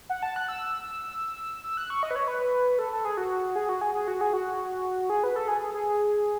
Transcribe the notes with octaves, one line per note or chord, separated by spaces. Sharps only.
F#5
A5
F#6
E6
E6
F#6
C#6
D#5
B4
C#5
B4
A4
A4
G#4
F#4
G#4
F#4
G#4
G#4
F#4
G#4
F#4
G#4
B4
A4
G#4
G#4
G#4